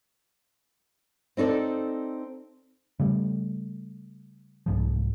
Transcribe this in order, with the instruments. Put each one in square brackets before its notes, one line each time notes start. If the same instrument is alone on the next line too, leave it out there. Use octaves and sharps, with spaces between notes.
[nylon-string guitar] C4 D#4 A4 D5
[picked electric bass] C#3 G3 A3
C2 G#2 F3